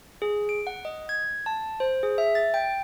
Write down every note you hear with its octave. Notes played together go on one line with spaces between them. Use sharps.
G#4
D7
F#5
D#5
G#6
A5
C5
G#4
E5
A6
G5